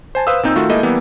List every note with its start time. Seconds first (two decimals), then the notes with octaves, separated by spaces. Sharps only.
0.15 C5 G#5 A5
0.27 B4 C5 F5 D#6 E6
0.43 A#2 C4 D#4 G6
0.56 D#3 A3 F4 F#4
0.69 G#3 A#3 E4 A4 D#5 E5
0.83 E3 G3 A#3 B3